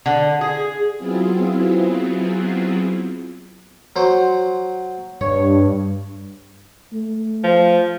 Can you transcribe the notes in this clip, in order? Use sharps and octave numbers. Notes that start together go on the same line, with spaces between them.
D3
G#4
F#3 B3 C4 E4 F4 G#4
F#3 C5
G2 C#5
A3
F3